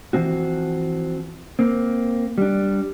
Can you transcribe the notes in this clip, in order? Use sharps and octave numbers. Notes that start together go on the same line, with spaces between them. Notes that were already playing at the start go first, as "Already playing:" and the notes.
E3 F3 C4 F#4
A#3 C4
G3 D4